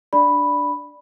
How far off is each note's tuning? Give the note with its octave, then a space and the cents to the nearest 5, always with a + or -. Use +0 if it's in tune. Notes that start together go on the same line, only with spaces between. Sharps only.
D4 +0 D5 +0 B5 +0